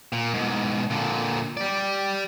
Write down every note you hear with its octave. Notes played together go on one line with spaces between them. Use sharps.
A#2
G#2 B2
A#2 D3
G4 D5